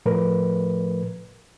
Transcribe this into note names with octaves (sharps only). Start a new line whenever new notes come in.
A2 F3 A3 A#4 B4